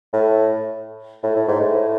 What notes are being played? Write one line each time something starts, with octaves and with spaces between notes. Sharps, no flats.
A2
A2
A2
G#2
A2